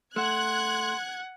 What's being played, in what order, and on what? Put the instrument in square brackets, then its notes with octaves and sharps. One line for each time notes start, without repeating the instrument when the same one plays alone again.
[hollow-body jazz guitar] A3 [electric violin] F#5 [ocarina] C6 [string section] F#6 G#6